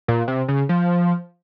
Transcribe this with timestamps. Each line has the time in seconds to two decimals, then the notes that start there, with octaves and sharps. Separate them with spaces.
0.08 A#2
0.28 C3
0.48 C#3
0.69 F3